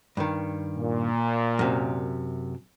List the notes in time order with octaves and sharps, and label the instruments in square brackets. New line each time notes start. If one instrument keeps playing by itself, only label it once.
[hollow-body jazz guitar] G2 D#3
[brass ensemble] A#2
[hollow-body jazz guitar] F#2 C3